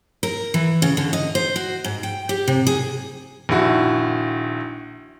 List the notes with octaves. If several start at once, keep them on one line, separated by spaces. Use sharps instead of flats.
A#4
E3
C#3
D3
D#5
C5
F#4
G#2
G5
G4
C3
G#4
A#1 D#3 E4 F#4